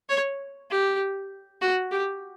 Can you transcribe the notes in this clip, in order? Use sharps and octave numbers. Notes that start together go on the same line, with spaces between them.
C#5
G4
F#4
G4